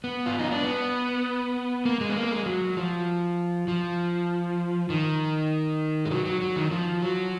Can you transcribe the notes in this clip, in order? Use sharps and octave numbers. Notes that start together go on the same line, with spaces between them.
B3
F4
D#4
D4
B3
A#3
G#3
B3
A#3
G#3
F#3
F3
F3
D#3
G#3
F#3
F#3
F#3
D#3
F3
F#3